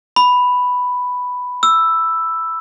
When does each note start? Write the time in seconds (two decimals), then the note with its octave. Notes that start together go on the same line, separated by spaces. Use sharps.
0.16 B5
1.63 E6